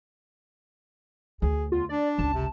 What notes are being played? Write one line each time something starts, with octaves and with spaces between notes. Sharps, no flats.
D2 G#4
E2 F4
D4 D5
G1 C#2 A5
C3